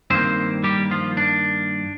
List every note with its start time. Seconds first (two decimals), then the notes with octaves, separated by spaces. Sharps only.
0.10 G2 D#3 A#3 C4 C5
0.63 G3 G4
0.91 F3 F4
1.17 D4